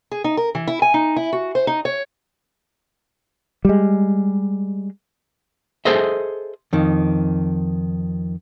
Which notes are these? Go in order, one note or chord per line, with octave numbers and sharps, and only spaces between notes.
G#4
D#4
A#4
E3
E4
G#5
D#4
E4
F#4
C5
D#4
C#5
G3 G#3
G#4 A4 C5 D#5 E5
F2 D#3